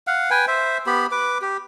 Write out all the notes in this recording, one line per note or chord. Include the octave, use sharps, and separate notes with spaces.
F5 F#5
B4 G5 G#5
C5 E5
B3 G4 B5
B4 D6
G4